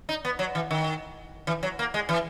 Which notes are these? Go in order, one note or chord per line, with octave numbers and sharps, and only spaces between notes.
D#4
B3
F#3
E3
D#3
E3
F#3
A#3
G#3
E3